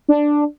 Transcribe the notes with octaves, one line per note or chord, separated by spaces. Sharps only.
D4